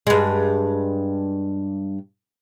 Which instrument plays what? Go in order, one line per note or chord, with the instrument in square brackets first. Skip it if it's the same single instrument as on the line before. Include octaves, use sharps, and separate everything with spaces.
[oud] G2 G#3